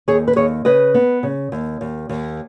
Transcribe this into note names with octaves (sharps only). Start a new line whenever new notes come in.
D#2 G#4 C#5
B4
D#2 G#4 C#5
C#3 B4 D#5
B3
C#3
D#2
D#2
D#2